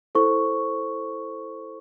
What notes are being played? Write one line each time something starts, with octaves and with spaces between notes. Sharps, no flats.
E4 A4 C5 C#6